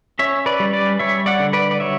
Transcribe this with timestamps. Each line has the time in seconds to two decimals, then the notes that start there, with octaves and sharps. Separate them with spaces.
0.19 C#4 C#5 E5
0.46 B4 D5
0.60 G3
0.73 B4 D5
0.99 G3 C#5 E5
1.26 D5 F#5
1.40 D3
1.53 B4 D5
1.71 D5
1.80 F#3 C#5 E5